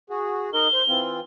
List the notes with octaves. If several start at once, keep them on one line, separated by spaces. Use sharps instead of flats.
F#4 G#4
D#4 A#4 D#5 G7
C5
E3 C4 F4